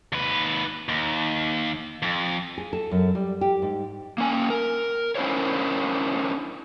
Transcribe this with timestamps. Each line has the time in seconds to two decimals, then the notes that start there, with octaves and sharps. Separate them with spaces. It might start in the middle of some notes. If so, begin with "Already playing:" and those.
0.13 D#2 B4
0.89 D#2
2.02 F2
2.58 G#4
2.73 A4
2.91 F#2
3.15 G3
3.41 G4
3.62 G#2
4.18 A#3 C#4 G#5
4.50 A#4
5.15 C#4 D4 E4 A#4 C5 C#5